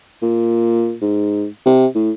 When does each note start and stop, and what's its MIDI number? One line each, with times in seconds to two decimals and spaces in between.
0.22 0.95 46
1.01 1.46 44
1.66 1.86 48
1.95 2.11 45